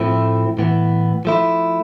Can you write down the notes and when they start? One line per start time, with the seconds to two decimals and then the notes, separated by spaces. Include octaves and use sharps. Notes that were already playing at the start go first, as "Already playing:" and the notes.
Already playing: A2 F3 A3 C4 E4
0.59 A2 E3 B3
1.25 F3 A3 E4